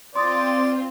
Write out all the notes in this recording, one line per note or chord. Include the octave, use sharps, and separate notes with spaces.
C4 F4 D5 C6 D#6 A6